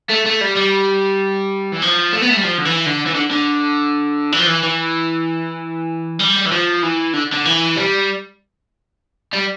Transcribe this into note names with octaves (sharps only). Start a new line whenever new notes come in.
A3
A3
G3
G3
E3
F3
A3
B3
A3
G3
F3
D3
E3
D3
E3
D3
D3
E3
F3
E3
E3
G3
E3
F3
E3
D3
D3
E3
G3
G3